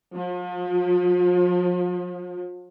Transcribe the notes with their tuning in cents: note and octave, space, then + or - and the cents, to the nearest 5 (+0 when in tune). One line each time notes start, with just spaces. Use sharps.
F3 +40